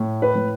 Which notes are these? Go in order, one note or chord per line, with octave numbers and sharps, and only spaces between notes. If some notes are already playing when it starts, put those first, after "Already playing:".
Already playing: A2
B4
A2